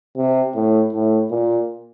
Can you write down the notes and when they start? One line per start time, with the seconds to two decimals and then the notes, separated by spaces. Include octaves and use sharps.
0.17 C3
0.55 A2
0.93 A2
1.31 A#2